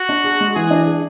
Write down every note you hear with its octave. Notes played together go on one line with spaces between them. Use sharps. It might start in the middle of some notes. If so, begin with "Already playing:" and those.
Already playing: F#4
D4
G#4
G#3
E3 G#4
D4
G#4